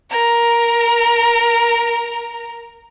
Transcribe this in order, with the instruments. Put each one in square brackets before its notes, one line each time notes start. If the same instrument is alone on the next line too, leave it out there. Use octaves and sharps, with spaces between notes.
[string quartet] A#4 A#5